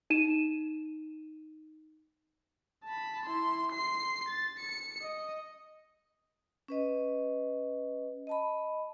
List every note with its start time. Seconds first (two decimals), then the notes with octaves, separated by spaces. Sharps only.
0.10 D#4 D#7 E7
2.85 A5 B5
3.25 E4 C6
3.72 C6 C7
4.29 A6
4.60 C#7
5.01 D#5
6.68 C#4 B4 D#5
8.27 D#5 A5 B5